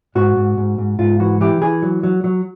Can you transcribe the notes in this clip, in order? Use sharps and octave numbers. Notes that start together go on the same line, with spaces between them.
G#2 F#4
G#2
G#2
G#2
G#2 F4
E3 F#4
E3 G4
E3 G#4
F#3
F#3
F#3